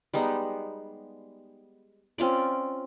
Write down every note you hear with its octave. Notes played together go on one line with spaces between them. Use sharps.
G3 G#3 B3 D#4
C4 C#4 F4 D5